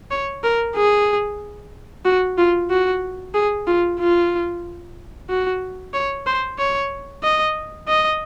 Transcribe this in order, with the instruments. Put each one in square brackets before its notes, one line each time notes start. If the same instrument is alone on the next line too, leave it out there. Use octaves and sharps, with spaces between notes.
[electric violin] C#5
A#4
G#4
F#4
F4
F#4
G#4
F4
F4
F#4
C#5
C5
C#5
D#5
D#5